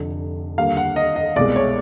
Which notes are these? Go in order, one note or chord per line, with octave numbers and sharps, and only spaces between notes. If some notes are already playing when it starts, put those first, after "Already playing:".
Already playing: F1 F2 D3
D#2 D3 G3 A#3 F5
F#5
D#5
D#5
C2 B2 G#3 D5
C#5